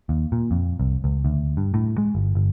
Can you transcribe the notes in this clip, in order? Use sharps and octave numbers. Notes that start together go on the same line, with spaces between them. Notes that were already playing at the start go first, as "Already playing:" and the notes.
D#2
A#2
F2
C2
C#2
D2
G2
A2
G#3
G1
G1